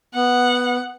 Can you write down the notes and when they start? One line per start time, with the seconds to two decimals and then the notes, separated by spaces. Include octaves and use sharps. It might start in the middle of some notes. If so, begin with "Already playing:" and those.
0.15 B3 F#5